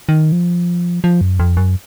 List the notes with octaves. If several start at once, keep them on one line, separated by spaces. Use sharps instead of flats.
D#3
F3
F3
F#2
F2
F#2